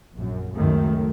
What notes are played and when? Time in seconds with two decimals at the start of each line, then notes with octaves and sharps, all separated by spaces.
0.15 A#1 F#2
0.56 C#2 F#2 D#3 A3